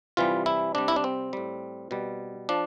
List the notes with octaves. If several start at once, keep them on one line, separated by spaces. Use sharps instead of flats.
C3 E3 G3 F4
E4
C3 G3 D4
E4
D4
C4
A2 G3
B2 G3
F3 D4